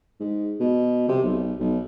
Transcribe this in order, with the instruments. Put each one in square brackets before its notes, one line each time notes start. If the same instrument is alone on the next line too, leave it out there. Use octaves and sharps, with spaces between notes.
[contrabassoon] G#2
B2
C3
B1
B1